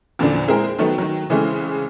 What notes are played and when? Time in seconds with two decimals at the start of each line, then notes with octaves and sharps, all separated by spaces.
0.19 E2 A#2 D3 F3 D4
0.48 G#3 C4 E4 G#4 A#4
0.78 D#3 F#3 A3 B3
0.98 D#3 F#3
1.30 C#3 E3 G#3 A3 C4